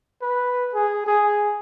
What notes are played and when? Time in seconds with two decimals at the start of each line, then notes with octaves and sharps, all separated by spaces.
0.22 B4
0.75 G#4
1.07 G#4